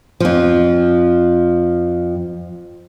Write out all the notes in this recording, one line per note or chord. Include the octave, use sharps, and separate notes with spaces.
F2 F3